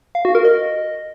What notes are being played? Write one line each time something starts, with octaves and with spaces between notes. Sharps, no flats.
F5
F#4
A#4
D#5